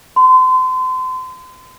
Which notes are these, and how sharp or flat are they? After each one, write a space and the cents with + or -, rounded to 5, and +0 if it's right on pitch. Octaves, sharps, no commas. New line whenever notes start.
C6 -35